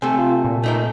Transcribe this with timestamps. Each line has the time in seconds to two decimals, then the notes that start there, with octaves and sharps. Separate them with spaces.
0.02 C3 A3 G#5 A5
0.19 F4
0.45 A#2
0.64 A3 D#4 A#4